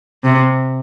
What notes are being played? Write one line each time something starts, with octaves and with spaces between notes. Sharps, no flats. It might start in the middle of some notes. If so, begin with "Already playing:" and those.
C3